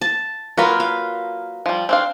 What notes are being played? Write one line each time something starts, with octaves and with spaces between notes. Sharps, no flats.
A5
F#3 A#3 F4 A#4 B4
F5
F3 G3
C4 D4 F5